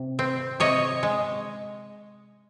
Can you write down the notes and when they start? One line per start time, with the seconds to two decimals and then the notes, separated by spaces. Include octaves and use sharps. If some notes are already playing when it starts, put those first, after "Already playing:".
Already playing: C3
0.19 C4
0.60 C3 C#5 D#5
1.03 G#3